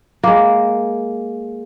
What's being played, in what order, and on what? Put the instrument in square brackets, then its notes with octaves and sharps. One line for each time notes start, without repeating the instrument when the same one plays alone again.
[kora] G#3 A#3